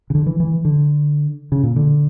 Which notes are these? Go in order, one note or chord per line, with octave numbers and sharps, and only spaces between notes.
C#3
D3
E3
E3
D3
C#3
A#2
D3